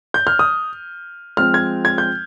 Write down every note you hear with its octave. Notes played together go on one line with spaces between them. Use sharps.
G6
F6
D#6
F3 G#3 C4 F6
G#6
G#6
G6